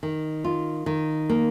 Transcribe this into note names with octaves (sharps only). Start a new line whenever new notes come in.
D#3
F4
D#3
A#3